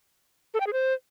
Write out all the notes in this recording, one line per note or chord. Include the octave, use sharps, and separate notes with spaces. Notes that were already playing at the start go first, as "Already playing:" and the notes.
A4
G5
G#4
C5